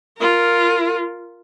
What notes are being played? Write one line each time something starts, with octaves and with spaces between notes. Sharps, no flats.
F4 A#4